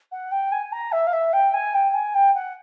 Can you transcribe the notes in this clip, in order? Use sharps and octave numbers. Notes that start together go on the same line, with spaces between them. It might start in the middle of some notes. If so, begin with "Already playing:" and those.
F#5
G5
G#5
A#5
E5
F5
E5
G5
G#5
G5
G#5
G5
F#5